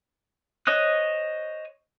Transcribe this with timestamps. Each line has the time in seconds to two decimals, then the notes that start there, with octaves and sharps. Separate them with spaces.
0.67 C5 C#5 D#5 D#6 F#6